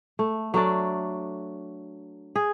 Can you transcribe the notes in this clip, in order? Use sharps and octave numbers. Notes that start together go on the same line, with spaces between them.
A3
F#3 A3 D4 D5
G#4